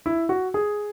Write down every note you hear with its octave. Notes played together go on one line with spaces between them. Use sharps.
E4
F#4
G#4